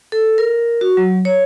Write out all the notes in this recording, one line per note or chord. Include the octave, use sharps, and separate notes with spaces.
A4
A#4
F#4
F#3
C#5